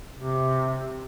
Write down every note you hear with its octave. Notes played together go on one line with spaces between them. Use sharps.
C3